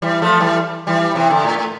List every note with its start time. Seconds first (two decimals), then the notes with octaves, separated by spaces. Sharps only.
0.02 E3 G3
0.22 F3 A3
0.40 E3 G3
0.87 E3 G3
1.15 C3 E3
1.30 D3
1.44 A2
1.59 A2